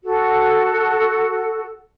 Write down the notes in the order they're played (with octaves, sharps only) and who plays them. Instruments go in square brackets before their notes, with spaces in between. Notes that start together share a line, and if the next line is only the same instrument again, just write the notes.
[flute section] F#4 A4